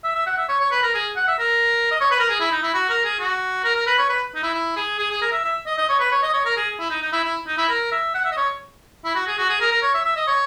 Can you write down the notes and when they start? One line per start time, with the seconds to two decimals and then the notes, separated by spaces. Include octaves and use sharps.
0.04 E5
0.15 E5
0.27 F#5
0.38 E5
0.49 C#5
0.60 C#5
0.71 B4
0.83 A#4
0.94 G#4
1.16 F#5
1.28 E5
1.39 A#4
1.91 D#5
2.01 C#5
2.11 B4
2.19 A#4
2.29 G#4
2.40 E4
2.52 D#4
2.63 E4
2.74 F#4
2.89 A#4
3.05 G#4
3.20 F#4
3.64 A#4
3.75 A#4
3.87 B4
3.98 C#5
4.09 B4
4.35 D#4
4.43 E4
4.54 E4
4.76 G#4
4.99 G#4
5.11 G#4
5.22 A#4
5.32 E5
5.44 E5
5.66 D#5
5.78 D#5
5.89 C#5
6.00 B4
6.12 C#5
6.23 D#5
6.33 C#5
6.46 A#4
6.56 G#4
6.79 E4
6.90 D#4
7.02 D#4
7.12 E4
7.24 E4
7.47 D#4
7.58 E4
7.69 A#4
7.92 E5
8.14 F#5
8.25 E5
8.32 D#5
8.37 C#5
9.05 E4
9.15 F#4
9.27 G#4
9.38 F#4
9.49 G#4
9.60 A#4
9.71 A#4
9.83 C#5
9.94 E5
10.05 E5
10.16 D#5
10.28 C#5